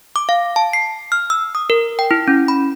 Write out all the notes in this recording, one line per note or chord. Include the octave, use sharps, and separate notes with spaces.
D6
F5
A5
C7
F6
E6
D#6
A#4
G5
E4
C#4
B5